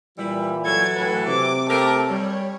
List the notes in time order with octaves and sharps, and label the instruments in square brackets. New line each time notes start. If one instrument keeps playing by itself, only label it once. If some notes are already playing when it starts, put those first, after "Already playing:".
[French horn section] A#2 E3 [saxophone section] G3 E4
[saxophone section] F#3 A4 [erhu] G#6
[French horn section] A2 E3 [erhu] B4
[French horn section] C3 [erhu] D6
[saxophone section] A3 G4 A#4 [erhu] A4
[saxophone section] G3 [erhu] C#5